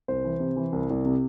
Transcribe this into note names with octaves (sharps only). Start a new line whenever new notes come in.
C2 C5
E3
C3
E3
C2
C2
C3